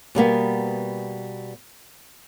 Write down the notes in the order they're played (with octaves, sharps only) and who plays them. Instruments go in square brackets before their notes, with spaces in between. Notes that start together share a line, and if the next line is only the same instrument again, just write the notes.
[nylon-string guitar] B2 G3 A#3 B3